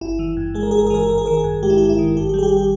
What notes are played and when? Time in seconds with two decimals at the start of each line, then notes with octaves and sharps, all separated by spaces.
0.01 G1 E4
0.19 E3
0.37 G2
0.54 G#3 G#4
0.63 A#4
0.71 G1 G#4
0.79 A#4
0.86 G#4
0.90 E3 A#4
1.03 G#4
1.08 G#1 A#4
1.18 G#4
1.26 D#3 A#4
1.33 G#4
1.44 G2
1.63 G#3 G4
1.70 E4
1.78 G#1 G4
1.89 E4
1.99 D#3
2.16 G#1 G4
2.29 G4
2.34 G3 G#4
2.43 G4
2.57 G4